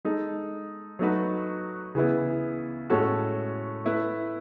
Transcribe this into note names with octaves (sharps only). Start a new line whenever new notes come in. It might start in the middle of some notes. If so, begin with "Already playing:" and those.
G#3 D#4 A4
F#3 A3 D#4 F#4 B4
C#3 E3 B3 E4
A2 G#3 C#4 F#4 A4
A3 E4 B4